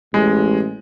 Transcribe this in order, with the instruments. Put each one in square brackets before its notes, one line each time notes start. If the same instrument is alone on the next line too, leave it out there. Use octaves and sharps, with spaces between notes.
[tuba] A1 [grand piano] G#3